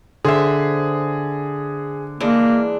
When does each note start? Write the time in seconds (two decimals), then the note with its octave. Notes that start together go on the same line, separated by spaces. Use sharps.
0.25 D3 G#4 C5 E5
2.21 E3 G#3 A#3 D4